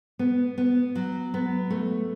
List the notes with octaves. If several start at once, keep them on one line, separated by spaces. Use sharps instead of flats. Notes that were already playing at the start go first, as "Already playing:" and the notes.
B3
B3
F#3
B3
A3